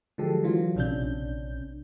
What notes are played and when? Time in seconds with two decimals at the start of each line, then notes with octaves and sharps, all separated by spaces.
0.18 D3 F3 F#3 G#3 G4 A4
0.44 E3 F#3 F4
0.75 A#1 C3 C#4 D4 G6